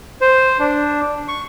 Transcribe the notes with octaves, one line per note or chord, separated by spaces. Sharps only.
C5
D4
C#6